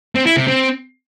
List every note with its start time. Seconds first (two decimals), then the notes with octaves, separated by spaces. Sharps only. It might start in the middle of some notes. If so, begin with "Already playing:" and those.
0.15 C4
0.26 E4
0.36 C3
0.47 C4